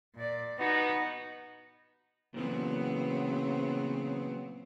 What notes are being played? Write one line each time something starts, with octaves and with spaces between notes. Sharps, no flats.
A#2 D5
B3 D#4 F#4
A#2 C#3 E3 F#3 B3 C4